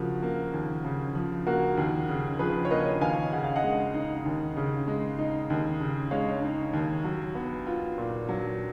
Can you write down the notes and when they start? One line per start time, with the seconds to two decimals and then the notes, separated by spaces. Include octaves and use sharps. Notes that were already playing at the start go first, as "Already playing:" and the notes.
Already playing: C#3 F3 F#4 A#4
0.22 A#3
0.53 D#2
0.85 C#3
1.15 F3
1.47 A#3 F#4 A#4
1.77 D#2
2.09 C#3
2.39 F3 G#4 B4
2.65 C#5
2.70 A#3 B4 D#5
3.01 D#2 F5 G#5
3.32 C#3 F#5
3.44 F5
3.55 D#5 F#5
3.64 G#3
3.94 D#4
4.25 D#2
4.57 C#3
4.88 G#3
5.19 D#4
5.50 D#2
5.81 C#3
6.11 G#3 C#5 F5
6.42 D#4
6.73 D#2
7.04 F#3
7.35 B3
7.67 F4
7.98 A#2
8.29 F#3